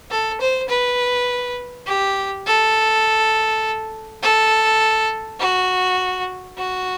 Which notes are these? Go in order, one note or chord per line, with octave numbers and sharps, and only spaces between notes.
A4
C5
B4
G4
A4
A4
F#4
F#4